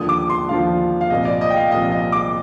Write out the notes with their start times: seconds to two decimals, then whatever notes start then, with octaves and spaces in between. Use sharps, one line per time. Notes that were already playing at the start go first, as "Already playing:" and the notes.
Already playing: D#2 D3 F3 D#6
0.09 D6
0.29 C6
0.49 D#2 D3 F3 F5
1.01 F5
1.10 C2 A#2 F3 D#5
1.25 D5
1.41 D#5
1.50 G5
1.56 F5
1.72 C2 A#2 F3 D#5
1.92 D#5
2.12 D6